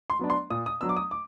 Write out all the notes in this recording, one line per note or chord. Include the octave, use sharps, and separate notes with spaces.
C6
F#3 B3 D4
C6
A#2 D#6
D#6
F#3 B3 D4 E6
D6
D#6
D6